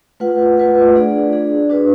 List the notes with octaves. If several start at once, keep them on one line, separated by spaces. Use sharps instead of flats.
A3 F4 B4 F#5
A3 F4 B4 F#5
D4 G#4 D5
D4 G#4 D5
D4 F#4 B4